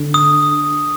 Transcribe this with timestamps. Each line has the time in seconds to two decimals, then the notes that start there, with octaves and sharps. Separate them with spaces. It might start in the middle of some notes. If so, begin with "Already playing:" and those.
Already playing: D3
0.14 D#6